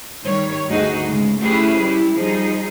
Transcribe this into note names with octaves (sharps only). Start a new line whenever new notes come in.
D#3 G3 C#5
D2 G2 D#4 F#4 G#4 D#5
D2 C#3 G#3
A3 C#4 E4 G4 G#4 B4
G3 E4 G4
F3 G3 D#4 G#4